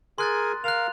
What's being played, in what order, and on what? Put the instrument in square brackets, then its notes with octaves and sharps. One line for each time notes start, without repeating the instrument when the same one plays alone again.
[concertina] G#4 A#4 G#5 [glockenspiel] C6 F#6 A6
[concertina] A#4 F5 [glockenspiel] F#6 F7